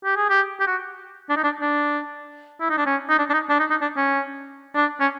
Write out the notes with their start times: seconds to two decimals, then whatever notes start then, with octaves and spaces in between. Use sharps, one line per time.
0.04 G4
0.17 G#4
0.29 G4
0.60 G4
0.67 F#4
1.29 D4
1.37 D#4
1.44 D4
1.61 D4
2.61 E4
2.70 D#4
2.78 D4
2.86 C#4
3.09 D#4
3.18 D4
3.30 D4
3.33 D#4
3.49 D4
3.59 D#4
3.70 D#4
3.81 D4
3.97 C#4
4.75 D4
5.00 C#4